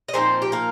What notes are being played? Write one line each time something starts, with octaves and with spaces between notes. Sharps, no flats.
D#5
A#2 F3 C4 D#4 C5
G4
A#3 A#4